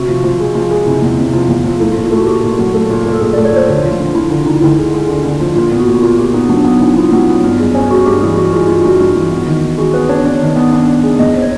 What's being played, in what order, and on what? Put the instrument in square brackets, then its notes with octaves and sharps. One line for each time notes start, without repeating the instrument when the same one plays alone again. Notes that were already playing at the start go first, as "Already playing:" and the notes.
Already playing: [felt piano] C3 [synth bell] F#4
[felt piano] F3
F3
G#3
F3
G#3
[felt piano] C3 [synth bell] E4
[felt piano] E2
C3
F3
E2
F3
[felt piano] A3 [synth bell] E4
[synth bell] F4
[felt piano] A#2
[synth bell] F4
[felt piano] A3 [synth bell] F#4
[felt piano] A#2 [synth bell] G4
[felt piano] A#2
F#3
A3
A#2
A#2
[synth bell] A4
[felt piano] A#2 [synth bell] G#4
[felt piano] A3 [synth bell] D5
[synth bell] C#5
[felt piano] A#2 [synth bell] C5
[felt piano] D2
F3
[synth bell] F4
[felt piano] D3
[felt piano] F3 [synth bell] E4
[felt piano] D3 [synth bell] E4
[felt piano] D3 [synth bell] D#4
[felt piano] D2 [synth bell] E4
[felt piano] G#3
G#3
D3
D3
F3
[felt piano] A#2 [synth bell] F4
[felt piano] B3
[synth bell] F#4
[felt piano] A#2
[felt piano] A#2 [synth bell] F4
[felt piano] A#2 [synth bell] G4
[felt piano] B3 [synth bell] D#4
[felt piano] F#3 [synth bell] D4
[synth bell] D4
[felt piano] B3 [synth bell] D#4
[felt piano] F#3 [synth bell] E4
[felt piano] B3 [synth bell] F4
[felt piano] F#3
B3
G2
G#3
C#4
[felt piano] G#3 [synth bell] F#4
[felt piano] G2 [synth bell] G4
[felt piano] E3 [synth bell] G#4
[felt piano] E3 [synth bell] F#4
[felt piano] G#3 [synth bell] F4
[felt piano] G2 [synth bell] F4
[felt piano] G2 [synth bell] F#4
[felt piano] G2
E3
B3
D#3
D#3
[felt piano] G#3 [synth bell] F#4
[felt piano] B3 [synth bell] B4
[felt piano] D4 [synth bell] C#5
[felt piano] D4
D#3
B3
D4
D4
G#3
[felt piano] E2 [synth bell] D#5
[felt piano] C4
[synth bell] C#5